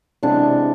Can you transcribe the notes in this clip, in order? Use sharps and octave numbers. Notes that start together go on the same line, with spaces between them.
C3 E3 G#3 B3 D4